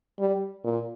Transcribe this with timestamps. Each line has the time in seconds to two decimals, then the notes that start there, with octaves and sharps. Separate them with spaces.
0.19 G3
0.64 A#2